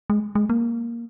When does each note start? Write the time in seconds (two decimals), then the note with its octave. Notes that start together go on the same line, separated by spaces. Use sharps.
0.10 G#3
0.35 G#3
0.50 A#3